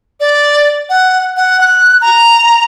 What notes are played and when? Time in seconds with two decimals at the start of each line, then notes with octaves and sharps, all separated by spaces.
0.20 D5
0.90 F#5
1.37 F#5
1.61 F#6
2.01 A#5